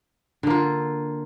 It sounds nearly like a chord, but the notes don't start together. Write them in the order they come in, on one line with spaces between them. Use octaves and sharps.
D3 A#3 F4